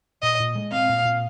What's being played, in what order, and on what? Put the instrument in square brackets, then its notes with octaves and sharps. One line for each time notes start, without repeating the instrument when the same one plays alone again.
[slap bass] A#2 [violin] D#5
[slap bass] A#2
G#3
[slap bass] C4 [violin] F5
[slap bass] A#2
A#2